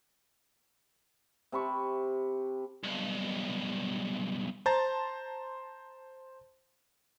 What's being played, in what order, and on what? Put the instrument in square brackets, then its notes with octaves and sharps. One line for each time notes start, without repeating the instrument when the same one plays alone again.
[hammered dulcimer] C3 A5 B5 C#6
[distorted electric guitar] B1 G2
[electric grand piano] C5 A5 A#5 C6 A6